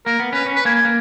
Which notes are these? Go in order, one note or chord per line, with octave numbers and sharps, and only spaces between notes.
A#3 A#4
B3
C#4 B4
C#4
B4
A#3 G#5
G#5
A#3